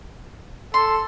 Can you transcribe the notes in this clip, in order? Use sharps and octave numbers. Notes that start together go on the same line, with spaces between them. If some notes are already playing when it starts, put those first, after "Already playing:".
A4 C6